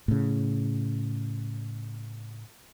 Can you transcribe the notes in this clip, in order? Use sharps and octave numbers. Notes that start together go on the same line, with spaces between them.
A2 C#3